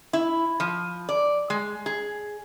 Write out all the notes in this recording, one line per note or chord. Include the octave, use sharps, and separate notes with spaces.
E4
F3
D5
G#3
G#4